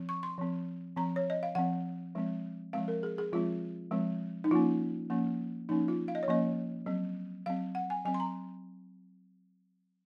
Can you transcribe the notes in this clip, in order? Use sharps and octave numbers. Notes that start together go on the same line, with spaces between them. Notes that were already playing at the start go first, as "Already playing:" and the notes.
Already playing: F3 C4
C#6
C6
F3 C4
F3 C4 A#5
C#5
D#5
F5
F3 C4 F#5
F3 G#3 C4
F3 G#3 C4 F5
A#4
G#4
G#4
F3 G#3 C4 F4
F3 G#3 C4
D#4
F3 A#3 C#4 F4
F3 A#3 C#4
F3 A#3 C#4 D#4
F4
F5
D#5
C#5
F3 A#3 C#4 D#5
F#3 C4
F#3 C4 F5
F#5
G#5
F#3 C4 G#5
C6
A#5